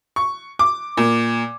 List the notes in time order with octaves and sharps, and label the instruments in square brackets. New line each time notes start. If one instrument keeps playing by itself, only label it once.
[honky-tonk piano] C#6
D6
A#2